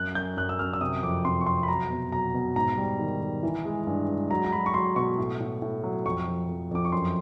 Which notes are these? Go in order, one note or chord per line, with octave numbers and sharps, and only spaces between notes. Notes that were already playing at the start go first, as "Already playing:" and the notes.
Already playing: F#2 F#6
F#2 G6
F#2 F#6
E6
F#2 F6
E6
C3 D#6
F2 D6
C3 C6
C#6
C3 C6
B5
F#3 A#5
B2
F#3 A#5
B2
G#2 A#5
G3
D#3
D#3
E3
G#3
G2
G#3
F#3 A#5
A#5
F#3 B5
C#6
F#3 C6
B2 C#6
A2
A2
A2
F#3
F2 C#6
F3
F2
F2 D6
C#6
F#2 C6